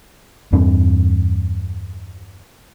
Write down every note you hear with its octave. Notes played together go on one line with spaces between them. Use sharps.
E2 G2 C4 D4